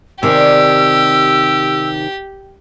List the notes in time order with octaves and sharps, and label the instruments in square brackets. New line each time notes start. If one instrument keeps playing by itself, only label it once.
[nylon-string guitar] C3 D#3 [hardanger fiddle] G4 [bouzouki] D5 G#5 [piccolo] E6